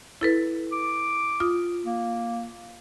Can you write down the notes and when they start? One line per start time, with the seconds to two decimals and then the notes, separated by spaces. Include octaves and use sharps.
0.21 E4 A4 B4
0.72 D6
1.40 F4 D#6
1.84 A#3